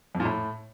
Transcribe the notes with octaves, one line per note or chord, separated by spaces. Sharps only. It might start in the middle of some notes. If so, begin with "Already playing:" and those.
F2
A#2
A2